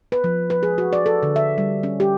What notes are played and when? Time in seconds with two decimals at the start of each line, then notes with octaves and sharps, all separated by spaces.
0.12 B4
0.24 F3
0.50 B4
0.63 G#4
0.78 F#4
0.93 D5
1.06 A4
1.23 D3
1.36 E5
1.58 G3
1.83 C#4
2.00 G4